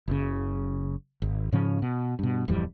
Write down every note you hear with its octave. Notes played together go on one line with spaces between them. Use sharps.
F#1 C#3
G#1
G#2 C#3 F3 C#4
B2
G2 B2
D1 F2 E3 G3